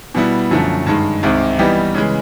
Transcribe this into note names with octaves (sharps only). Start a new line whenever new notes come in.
B2 G3 B3 E4
F#2 D3 F3 A3
G2 D#3 G#3
C2 C3 D#3 G#3 C4
E3 G3 B3 D#4 G4
C#3 E3 G#3